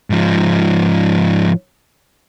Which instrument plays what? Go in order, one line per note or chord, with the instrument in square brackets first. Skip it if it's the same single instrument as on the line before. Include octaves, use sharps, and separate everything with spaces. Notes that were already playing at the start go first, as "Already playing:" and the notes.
[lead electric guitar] G#2 F3